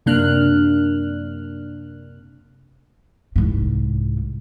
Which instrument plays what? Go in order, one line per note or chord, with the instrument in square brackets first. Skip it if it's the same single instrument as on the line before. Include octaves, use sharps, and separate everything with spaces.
[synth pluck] F#2 C3 A#3 D4 F6 F#6
[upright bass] C2 G#2